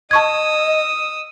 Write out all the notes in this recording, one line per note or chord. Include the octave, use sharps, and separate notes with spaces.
D#5 A5 C#6 D#6 E6 G#6